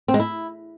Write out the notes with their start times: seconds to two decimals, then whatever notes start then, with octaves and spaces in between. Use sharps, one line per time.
0.08 C4
0.14 G#3
0.19 E4